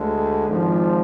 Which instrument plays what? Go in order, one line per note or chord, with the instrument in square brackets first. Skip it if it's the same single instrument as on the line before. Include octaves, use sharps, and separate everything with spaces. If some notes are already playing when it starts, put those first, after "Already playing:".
Already playing: [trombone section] D2 D3 G#3
G#1 G#2 F3